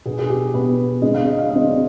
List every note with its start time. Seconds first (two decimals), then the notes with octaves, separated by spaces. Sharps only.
0.06 B2 B3 G#4
0.19 G#4
0.30 G4
0.54 B2 B3 B4
1.02 D3 G#3 C4 D#5
1.14 F5
1.27 D#5
1.39 F5
1.51 D3 G#3 C4 D#5
1.67 D5